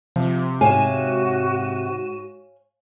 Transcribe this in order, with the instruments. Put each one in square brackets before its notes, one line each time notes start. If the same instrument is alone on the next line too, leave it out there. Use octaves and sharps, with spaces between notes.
[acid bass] C3 [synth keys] F3
[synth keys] G#2 D#7 E7 [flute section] F#4 [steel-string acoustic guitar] C#5 F5 G#5